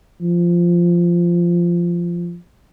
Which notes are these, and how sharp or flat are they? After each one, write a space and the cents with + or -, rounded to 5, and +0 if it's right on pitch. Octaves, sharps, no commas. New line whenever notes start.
F3 -10